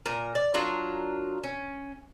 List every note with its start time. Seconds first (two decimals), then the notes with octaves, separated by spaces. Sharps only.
0.06 A#2 A#4
0.35 D5
0.54 F#3 D4 F4 A#4
1.44 C#4